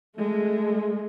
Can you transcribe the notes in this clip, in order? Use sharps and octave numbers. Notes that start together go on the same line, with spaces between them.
G#3 A3